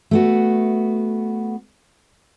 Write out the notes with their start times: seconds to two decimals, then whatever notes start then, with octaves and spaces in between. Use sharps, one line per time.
0.11 A3 B3 F#4